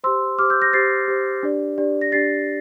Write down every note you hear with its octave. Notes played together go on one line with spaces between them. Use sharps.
G4 C5 C6 E6
G4 C5 D6 F6
E6 G6
G6 A#6
G4 C5 A6 C7
G4 C5
D4 G4 D5
D4 G4 D5
A#6
D4 G4 D5 A6 C7